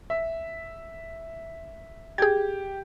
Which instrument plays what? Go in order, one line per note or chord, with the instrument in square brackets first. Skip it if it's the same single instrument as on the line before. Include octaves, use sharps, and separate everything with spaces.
[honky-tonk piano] E5
[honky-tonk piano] G4 [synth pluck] G#4 G#6